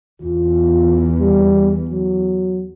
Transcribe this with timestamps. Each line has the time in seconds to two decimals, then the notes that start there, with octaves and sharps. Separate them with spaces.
0.22 E2 F4
1.20 G3
1.91 F#3